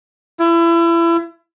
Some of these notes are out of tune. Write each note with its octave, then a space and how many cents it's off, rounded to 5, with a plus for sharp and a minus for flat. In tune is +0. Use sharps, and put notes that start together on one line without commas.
E4 +30